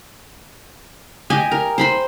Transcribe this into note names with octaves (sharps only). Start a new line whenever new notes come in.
G4 D#5 G#5
A#4
C5 B5 C6